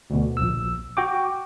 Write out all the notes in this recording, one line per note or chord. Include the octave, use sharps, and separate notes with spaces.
D2 B2
A#1 E6
F#4 G5 D6